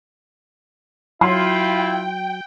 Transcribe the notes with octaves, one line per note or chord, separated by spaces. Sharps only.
F#3 E4 F4 G5 C6